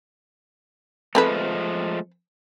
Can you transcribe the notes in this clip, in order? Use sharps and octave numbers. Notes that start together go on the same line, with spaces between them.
F3 G#3 A3 C4 A4 B4